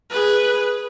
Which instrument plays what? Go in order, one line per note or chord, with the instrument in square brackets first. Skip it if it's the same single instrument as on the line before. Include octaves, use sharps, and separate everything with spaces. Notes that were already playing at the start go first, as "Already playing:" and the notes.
[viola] G#4 B4